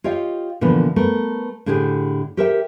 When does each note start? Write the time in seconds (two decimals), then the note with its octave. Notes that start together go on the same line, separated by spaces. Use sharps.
0.04 F4 G4 C#5 D#5 F5 G5
0.61 A#2 D3 E3 F3 B3
0.96 A3 B3 A#4
1.66 A2 D3 G4 G#4 B4 C5
2.37 G4 A4 A#4 C5 E5 G5